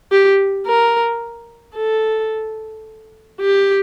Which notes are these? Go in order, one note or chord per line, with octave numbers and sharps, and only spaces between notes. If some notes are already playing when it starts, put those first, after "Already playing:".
G4
A#4
A4
G4